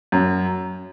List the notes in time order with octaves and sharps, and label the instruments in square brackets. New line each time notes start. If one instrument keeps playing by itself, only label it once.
[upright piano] F#2